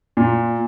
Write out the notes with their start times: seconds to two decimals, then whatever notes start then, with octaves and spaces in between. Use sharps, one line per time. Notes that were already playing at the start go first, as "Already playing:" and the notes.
0.17 A#2